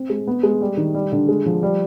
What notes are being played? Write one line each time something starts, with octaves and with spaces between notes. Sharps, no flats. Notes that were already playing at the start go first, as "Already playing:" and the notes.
Already playing: C4
G#3
B3
G#3
G3
D#3
G3
D3
G#3
F3
G3